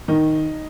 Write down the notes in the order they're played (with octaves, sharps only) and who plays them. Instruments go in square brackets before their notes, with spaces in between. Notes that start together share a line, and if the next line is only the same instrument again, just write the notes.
[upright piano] D#3 D#4